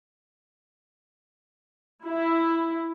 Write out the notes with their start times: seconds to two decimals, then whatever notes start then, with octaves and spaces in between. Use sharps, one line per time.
2.05 E4